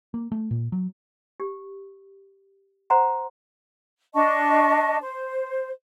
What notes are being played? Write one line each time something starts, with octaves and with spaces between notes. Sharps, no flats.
A#3
A3
A#2
F#3
G4
C5 F#5 A#5 C6
D4 D#5 A5 C#6
C5